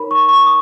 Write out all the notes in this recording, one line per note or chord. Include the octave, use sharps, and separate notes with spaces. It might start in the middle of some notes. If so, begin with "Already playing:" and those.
Already playing: D#4 A#4 C#5 B5
C#6
C#6
D#6